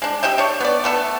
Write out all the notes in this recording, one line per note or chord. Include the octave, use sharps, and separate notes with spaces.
G#3 D4
G4 D#5 E5 G5
D4 C#5
B3 D5
A3 B3 A4